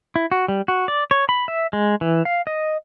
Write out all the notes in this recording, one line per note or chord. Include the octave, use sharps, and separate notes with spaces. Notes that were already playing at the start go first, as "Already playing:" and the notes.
E4
F#4
G3
F#4
D5
C#5
B5
E5
G#3
E3
F5
D#5